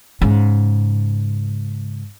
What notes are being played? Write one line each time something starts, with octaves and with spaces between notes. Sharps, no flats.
G#2 C#3